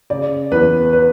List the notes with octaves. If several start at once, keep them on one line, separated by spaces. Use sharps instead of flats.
C#3 D5
E2 B4
B4